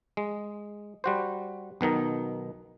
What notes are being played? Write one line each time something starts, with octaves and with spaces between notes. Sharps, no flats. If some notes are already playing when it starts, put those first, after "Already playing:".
G#3
G3 F#4 C5
B1 B2 D#3 D#4